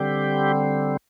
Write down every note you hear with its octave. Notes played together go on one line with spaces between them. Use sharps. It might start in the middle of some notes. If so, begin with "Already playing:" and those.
Already playing: D3 G3 C4 G4